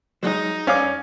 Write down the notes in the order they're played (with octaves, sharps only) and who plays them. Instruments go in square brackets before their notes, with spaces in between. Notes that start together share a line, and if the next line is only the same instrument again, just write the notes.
[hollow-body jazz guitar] F#3 G#3 [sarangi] D#4
[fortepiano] C#4 F5 D6 [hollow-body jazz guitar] D5